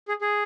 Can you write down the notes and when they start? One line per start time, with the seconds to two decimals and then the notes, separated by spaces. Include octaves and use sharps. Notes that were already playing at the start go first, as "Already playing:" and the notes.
0.08 G#4
0.21 G#4